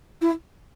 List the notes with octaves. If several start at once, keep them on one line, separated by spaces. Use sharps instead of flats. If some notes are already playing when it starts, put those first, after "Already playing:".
E4